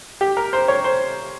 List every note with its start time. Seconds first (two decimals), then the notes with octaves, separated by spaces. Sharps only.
0.21 G4
0.37 A#4
0.53 C5
0.68 C#5
0.84 C5